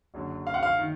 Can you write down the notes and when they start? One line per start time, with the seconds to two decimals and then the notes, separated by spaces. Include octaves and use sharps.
0.14 F#1 F#2 D3 F#3
0.47 F5
0.54 F#5
0.63 F5
0.79 D#3